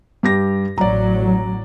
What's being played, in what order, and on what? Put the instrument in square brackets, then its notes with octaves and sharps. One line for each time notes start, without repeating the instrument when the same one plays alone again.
[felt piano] G2 G4 A#6
[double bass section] A1 F#3 [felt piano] D5 A#5